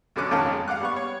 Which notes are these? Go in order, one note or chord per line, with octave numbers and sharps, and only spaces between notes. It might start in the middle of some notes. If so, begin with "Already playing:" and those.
B1 B2 D3 C#4 D6 F#6
G#1 F2 D#3 C#4 F5 A5
G#3
F5 F#5 D6 F#6
G3 B3 C#6
C#5